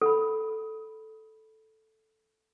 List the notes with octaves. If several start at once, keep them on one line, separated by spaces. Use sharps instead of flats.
A4 B5